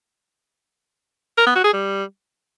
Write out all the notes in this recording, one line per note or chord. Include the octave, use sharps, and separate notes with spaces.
A#4
B3
F#4
G#4
G3